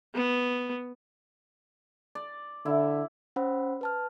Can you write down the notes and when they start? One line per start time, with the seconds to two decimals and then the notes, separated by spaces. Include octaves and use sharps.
0.15 B3
2.15 D5
2.65 D3 E4
3.36 C#4 C5 F#5 B5 E6
3.81 B4 A5 F6